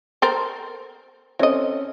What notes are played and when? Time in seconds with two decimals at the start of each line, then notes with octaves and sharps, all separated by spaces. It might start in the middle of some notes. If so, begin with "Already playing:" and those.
0.22 A4 A#4 C5
1.39 E3 C4 C#4 A4 D#5